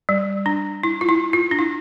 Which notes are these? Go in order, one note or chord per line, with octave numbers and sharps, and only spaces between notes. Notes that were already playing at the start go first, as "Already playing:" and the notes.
G3
D4
E4
F4
E4
F4
D4
E4